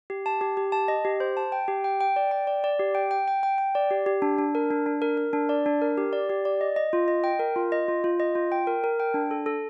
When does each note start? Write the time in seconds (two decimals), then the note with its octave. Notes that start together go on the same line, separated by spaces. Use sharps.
0.10 G4
0.26 A5
0.41 G4
0.57 G4
0.72 A5
0.88 D#5
1.05 G4
1.20 C5
1.37 A5
1.52 G5
1.68 G4
1.84 G5
2.01 G5
2.16 D5
2.31 G5
2.47 D5
2.64 D5
2.80 G4
2.95 G5
3.11 G5
3.28 G5
3.43 G5
3.58 G5
3.75 D5
3.91 G4
4.06 G4
4.22 D4
4.38 D4
4.55 A#4
4.71 D4
4.86 D4
5.02 A#4
5.17 A#4
5.33 D4
5.49 D5
5.66 D4
5.82 A#4
5.98 G4
6.13 D5
6.30 G4
6.45 D5
6.61 D#5
6.76 D#5
6.93 F4
7.08 D#5
7.24 G5
7.40 A#4
7.56 F4
7.72 D#5
7.88 F4
8.04 F4
8.20 D#5
8.35 F4
8.52 G5
8.67 A#4
8.84 A#4
9.00 G5
9.14 D4
9.31 A4
9.46 A4